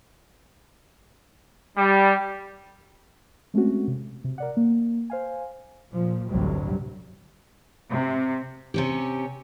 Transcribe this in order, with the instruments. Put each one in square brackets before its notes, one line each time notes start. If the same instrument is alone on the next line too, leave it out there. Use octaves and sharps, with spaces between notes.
[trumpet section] G3
[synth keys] G#3 A3 C4 C#4 F#4
C3
C3
A#4 D5 F#5
A#3
C5 F5 G#5
[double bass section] A#2 F3
A1 D2 G2 C3 F#3 G3
[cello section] C3
[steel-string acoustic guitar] C3 C#4 G4